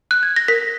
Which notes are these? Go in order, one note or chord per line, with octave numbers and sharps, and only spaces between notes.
F#6
G#6
A#6
A#4 B6